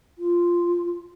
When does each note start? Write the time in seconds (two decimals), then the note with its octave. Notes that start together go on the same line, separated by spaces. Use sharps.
0.18 F4